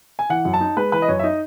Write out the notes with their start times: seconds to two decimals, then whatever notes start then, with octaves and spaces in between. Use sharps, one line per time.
0.19 G#5
0.29 E3 F#5
0.45 F#2
0.54 A5
0.61 D#4
0.77 G#3 B4
0.92 E3 B4
1.02 D#5
1.08 F#2 C#5
1.19 E5
1.23 D#4 D#5